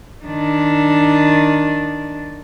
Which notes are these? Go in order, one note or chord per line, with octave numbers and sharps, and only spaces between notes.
D#3 D4